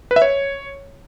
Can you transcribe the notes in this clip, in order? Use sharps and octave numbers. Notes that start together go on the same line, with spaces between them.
B4
E5
C#5